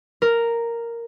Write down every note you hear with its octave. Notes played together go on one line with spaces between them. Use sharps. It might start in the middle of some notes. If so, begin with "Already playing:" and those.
A#4